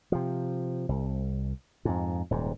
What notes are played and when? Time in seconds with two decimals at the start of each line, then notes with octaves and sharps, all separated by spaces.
0.12 C3 F3
0.89 C2
1.85 F2 G#2
2.31 D#1 G#2